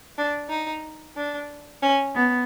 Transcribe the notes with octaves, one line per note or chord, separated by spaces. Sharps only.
D4
D#4
D4
C#4
B3